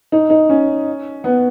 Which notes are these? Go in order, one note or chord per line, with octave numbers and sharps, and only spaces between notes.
D#4
D#4
C#4
B3